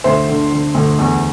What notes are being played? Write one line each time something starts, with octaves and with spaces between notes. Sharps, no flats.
D2 C5 E5
D3
D3
D2
E2